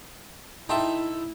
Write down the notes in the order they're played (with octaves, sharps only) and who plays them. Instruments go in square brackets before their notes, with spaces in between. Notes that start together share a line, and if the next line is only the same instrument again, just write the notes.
[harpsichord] D#4 A4 E5 [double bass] E4 [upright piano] G5 A5 C6